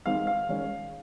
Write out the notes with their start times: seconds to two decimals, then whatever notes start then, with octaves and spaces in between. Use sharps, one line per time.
0.06 D#3 G#3 C4 D#4 F5
0.27 F5
0.49 D#3 G#3 C#4